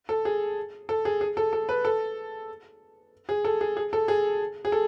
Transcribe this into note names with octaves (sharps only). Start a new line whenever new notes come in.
A4
G#4
A4
G#4
G#4
A4
A4
B4
A4
G#4
A4
G#4
G#4
A4
G#4
G#4
A4